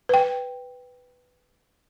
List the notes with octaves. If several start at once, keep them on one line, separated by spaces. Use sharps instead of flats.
B4 G5